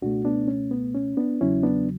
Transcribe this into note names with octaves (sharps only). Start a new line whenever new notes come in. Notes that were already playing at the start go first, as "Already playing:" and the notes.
C#2 B2 A3 D4 F#4
B3 D4
C#4
B3
C#4
B3 D4
E2 C#3 F#3 C#4 E4
B3 D4